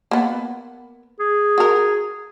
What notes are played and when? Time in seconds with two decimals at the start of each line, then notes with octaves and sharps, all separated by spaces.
0.11 A#3 B3
1.20 G#4
1.58 F#4 A#4